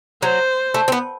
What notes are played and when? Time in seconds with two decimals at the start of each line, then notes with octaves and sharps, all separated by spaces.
0.23 F#3 C5
0.74 A3
0.88 C4
0.92 B3